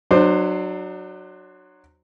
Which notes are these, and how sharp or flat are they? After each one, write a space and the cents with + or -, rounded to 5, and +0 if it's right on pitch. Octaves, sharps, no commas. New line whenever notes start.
F#3 +0 D4 +35 C5 +0